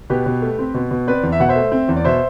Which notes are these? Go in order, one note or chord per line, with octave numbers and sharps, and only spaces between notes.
B2 G4 B4
B2
A3
C4
B2
B2
C4 B4 D5
E2
E5
B2 F#5
C5 E5
A3
C4
E2
D5
B2 C5 E5